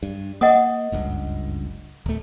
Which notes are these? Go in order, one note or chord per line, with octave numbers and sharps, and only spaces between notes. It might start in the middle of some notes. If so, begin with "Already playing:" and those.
G2
A#3 D#5 F#5 D#6
F#1 C#2 G2
D1 A3